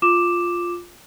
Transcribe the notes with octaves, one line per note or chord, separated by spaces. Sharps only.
F4 D6 E7